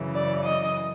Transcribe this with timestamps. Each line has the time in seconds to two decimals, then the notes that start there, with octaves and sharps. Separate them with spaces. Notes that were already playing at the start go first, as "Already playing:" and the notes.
Already playing: F#2 C#3 E3
0.14 D5
0.45 D#5